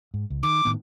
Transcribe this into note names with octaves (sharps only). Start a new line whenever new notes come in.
G#2
C#2
D#3 D6
A2 D#3 B3